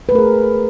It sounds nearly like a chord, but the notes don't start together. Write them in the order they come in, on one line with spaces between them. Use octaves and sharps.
B4 A3 A#4 G#4